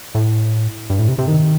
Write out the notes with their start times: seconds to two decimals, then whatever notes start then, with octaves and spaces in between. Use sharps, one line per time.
0.15 A2
0.90 G2
0.99 A2
1.08 C3
1.19 C3
1.28 D#3